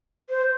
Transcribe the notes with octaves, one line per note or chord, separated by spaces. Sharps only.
C5